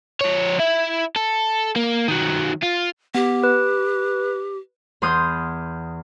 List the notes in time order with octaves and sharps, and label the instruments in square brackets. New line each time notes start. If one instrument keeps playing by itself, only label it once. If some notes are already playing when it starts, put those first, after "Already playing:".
[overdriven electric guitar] F3 C#5
E4 E5
A4
A#3
D#3 F#3
F4
[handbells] B3 [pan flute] G4
[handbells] B4
[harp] E2 B3 C6 D#6 F6 G6